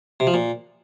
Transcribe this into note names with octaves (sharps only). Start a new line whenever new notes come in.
C3
F3
A#2